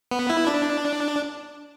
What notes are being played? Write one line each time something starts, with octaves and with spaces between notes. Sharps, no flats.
B3
E4
D4